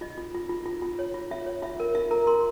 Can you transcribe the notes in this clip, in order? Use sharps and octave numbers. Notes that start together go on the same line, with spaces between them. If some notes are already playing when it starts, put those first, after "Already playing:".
F4 D#5
F4
F4
F4
F4
F4
C#5
F4
F4 E5
C#5
F4 E5
A#4
F4 E5
A#4 A#5
A#4 C6